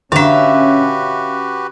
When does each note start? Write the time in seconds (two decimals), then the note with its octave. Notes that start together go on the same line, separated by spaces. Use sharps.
0.12 D3 C#4 D4 F#4 G4 B4 E5 F5